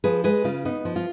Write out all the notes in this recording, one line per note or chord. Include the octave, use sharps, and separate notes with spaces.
F3 G#4 B4
G#3 G#4 B4
C#3 F4
B3 D#4
F3
F4